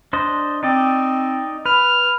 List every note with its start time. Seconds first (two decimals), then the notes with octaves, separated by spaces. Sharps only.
0.13 D4 C5 D#5
0.63 C4 D#4 D5 D#5
1.66 B4 F6